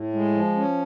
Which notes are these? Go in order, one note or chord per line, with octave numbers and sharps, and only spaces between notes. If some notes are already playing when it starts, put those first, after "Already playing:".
Already playing: A2
G#3
F3
C#4